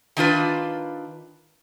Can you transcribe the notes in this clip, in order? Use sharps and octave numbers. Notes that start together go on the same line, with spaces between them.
D#3 D4 F4 B4